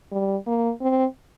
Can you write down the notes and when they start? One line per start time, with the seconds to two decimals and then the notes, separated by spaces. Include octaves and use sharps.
0.12 G3
0.47 A#3
0.81 C4